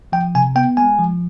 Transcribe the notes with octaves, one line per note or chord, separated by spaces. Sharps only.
F3 G5
C3 G#5
B3 G5
G#3 G#5
F3